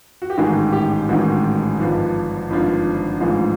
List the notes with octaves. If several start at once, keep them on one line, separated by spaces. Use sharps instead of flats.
F#4
G4
A1 G#2 D#3 F#4 G#4
G4
A1 G#2 D#3 F#4
G#1 G2 D3 F3
G#1 G2 D3 F3
A1 G#2 F3 G#3